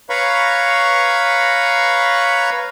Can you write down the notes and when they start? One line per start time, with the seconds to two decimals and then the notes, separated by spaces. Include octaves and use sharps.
0.10 B4 C#5 F5 A#5 B5 C#6